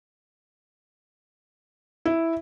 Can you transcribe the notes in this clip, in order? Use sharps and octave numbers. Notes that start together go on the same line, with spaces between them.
E4